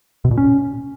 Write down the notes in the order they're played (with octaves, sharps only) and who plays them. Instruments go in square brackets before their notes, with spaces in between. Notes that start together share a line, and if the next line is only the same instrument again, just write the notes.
[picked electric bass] B2
A#2
C#4